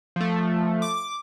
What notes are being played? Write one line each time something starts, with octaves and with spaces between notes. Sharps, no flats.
F3 A3
D6